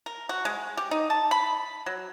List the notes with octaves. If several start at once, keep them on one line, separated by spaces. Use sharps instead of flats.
A#4
F#4
G#3
G4
D#4
A5
B5
F#3